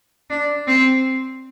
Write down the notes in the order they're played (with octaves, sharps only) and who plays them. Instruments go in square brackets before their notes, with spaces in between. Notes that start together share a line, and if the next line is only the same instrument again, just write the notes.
[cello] D4
C4